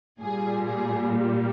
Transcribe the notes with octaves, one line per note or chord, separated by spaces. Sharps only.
A#2 G3 G#4
G#4